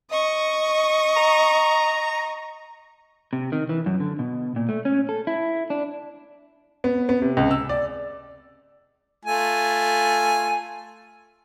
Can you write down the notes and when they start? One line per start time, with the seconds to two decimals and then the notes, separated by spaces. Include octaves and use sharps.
0.11 D#5 C#6
1.16 A#5
3.33 C3
3.52 D#3
3.69 E3
3.86 F#2
4.00 D3
4.19 B2
4.56 A#2
4.69 A3
4.85 C#4
5.09 A4
5.27 E4
5.70 D4
6.84 B3
7.09 B3
7.22 C3
7.37 C#2
7.51 E6
7.69 D5
9.25 A3 F4 G#5